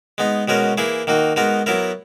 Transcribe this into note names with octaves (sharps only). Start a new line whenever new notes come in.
G#3 B3 D#4
B2 G#3 C#4 F#4 A#4
E3 A#3 E4 G#4
D#3 A#3 D#4 F#4
G#3 B3 D#4 F#4 A#4
F#3 B3 E4 A#4